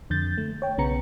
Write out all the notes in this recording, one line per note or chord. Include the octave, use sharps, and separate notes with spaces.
F2 D3 G6 A6
A3
C#5 G5
B1 C#3 B3 A#5 C#7